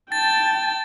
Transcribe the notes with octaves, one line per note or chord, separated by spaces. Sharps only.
G5 A5 A6